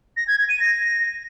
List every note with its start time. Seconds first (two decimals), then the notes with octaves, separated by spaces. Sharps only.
0.17 A#6
0.28 G#6
0.38 G#6
0.49 D#7
0.60 A#6